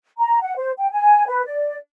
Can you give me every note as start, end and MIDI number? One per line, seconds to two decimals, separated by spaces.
0.19 0.40 82
0.41 0.54 78
0.57 0.72 72
0.78 0.90 79
0.91 1.27 80
1.27 1.43 71
1.46 1.76 74